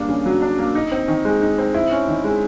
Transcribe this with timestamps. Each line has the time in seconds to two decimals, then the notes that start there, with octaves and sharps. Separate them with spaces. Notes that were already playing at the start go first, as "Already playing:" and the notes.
Already playing: G3 A#3 D4
0.09 C#3
0.26 F#3
0.42 D4
0.59 A#3
0.75 D#4
0.91 C4
1.08 D#3
1.25 G#3
1.42 D#4
1.58 C4
1.74 E4
1.91 C#4
2.08 D#3
2.24 G#3